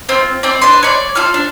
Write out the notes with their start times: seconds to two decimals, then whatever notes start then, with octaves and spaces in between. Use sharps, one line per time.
0.09 C4 F4
0.43 C4 D5
0.61 D4 B4 C6
0.83 C#5 D5
1.15 F4 A4 F6
1.34 D4